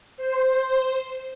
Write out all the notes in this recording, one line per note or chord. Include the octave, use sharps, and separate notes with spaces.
C5